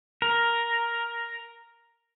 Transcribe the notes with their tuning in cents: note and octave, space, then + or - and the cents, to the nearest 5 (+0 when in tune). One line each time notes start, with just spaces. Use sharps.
A#4 +5